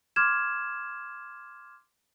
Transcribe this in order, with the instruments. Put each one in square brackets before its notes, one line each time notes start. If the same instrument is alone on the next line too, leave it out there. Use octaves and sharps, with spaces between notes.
[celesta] C6 D6 F6 G#6 E7